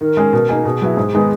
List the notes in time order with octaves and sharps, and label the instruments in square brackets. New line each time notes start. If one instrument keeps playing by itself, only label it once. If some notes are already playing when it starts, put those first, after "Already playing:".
[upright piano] D#3 [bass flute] A#4
[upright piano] G#3 C#4 G#4
B2
A#3 D#4 G#4
[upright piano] B2 [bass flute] G#4
[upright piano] F#3 B3 E4
G#2
D#3 G#3 B3 D#4